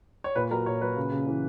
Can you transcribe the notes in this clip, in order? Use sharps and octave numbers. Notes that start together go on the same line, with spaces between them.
C#5
A#2 B4
F#3 A#4
A#2 C#5
F#3 B4
C#3
C#3
E3